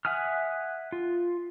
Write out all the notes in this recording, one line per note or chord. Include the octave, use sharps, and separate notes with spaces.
E5 F#5 G#5 D#6 F6
F4